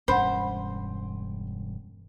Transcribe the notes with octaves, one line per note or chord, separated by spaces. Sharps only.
E1 G2 C#4 C5 F#5 B5